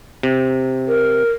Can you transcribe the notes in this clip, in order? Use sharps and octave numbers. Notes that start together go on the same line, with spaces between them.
C3
A#4